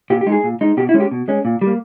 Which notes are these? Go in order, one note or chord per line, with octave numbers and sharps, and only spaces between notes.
A#2 G4
G4
G#3 D#4
G#4
A#2
G#3 D#4
B2 G4
E4
G#3 C#4
G4
B2
G#3 C#4
A#2
G3
A#3